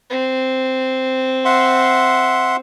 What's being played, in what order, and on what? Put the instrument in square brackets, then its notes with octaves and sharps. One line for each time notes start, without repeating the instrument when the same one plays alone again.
[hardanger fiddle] C4
[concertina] E5 F#5 C6